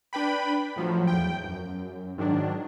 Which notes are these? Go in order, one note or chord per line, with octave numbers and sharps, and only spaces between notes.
D4 B4 G5 B5
A2 F3 F#3
E2 G5
F#2
G#2 D#3 F#3 D4